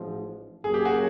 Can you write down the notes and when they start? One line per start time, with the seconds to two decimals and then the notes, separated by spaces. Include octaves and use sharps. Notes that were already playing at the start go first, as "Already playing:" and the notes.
Already playing: A1 G#2 F3
0.64 F#2 C#3 F#3 A#3 G#4
0.74 G4
0.85 F#4 G#4